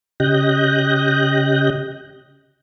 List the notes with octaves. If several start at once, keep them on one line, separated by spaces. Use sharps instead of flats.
C#3 G4 D#5 F#6 G6 A#6